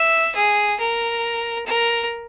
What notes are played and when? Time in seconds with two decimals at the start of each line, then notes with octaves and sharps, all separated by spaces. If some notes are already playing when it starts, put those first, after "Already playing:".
Already playing: E5
0.35 G#4
0.79 A#4
1.66 A#4